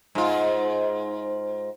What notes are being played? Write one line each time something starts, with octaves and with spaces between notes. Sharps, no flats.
G#2 F4